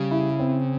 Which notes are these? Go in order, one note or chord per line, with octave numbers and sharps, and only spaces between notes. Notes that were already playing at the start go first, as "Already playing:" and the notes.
Already playing: C#3 G3
E4
C4